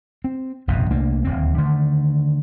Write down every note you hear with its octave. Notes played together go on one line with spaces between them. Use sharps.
C4
F1 A#1 G2 B2
C2 A3 A#3 D4
D1 D#2 C4
D3 D#3 A3